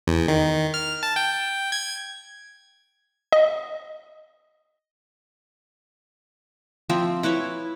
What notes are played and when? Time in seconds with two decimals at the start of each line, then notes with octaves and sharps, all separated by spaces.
0.07 E2
0.28 D#3
0.74 F6
1.03 A5
1.16 G5
1.72 G#6
3.32 D#5
6.90 F3 C4 E5
7.23 E4 B4 C#5 E5